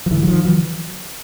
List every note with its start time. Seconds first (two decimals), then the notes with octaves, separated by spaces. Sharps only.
0.06 F3
0.11 G#2 D3 E3
0.23 F#3
0.28 D#3 F3
0.45 D3 E3 F#3